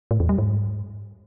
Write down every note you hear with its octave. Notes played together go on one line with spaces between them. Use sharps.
A2
E2
G3
G#2